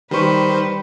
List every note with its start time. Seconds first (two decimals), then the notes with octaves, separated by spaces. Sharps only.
0.11 D#3 G3 B4 C5 C#6